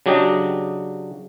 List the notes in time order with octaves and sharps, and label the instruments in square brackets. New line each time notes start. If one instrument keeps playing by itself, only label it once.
[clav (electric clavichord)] C#3 F#3 D4 G4 D#5 G5